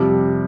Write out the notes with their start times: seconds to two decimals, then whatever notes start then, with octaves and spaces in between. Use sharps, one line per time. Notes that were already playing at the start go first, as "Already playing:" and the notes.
Already playing: F2 C3 G3